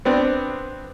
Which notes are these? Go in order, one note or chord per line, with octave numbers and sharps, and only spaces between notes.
B3 C4 D4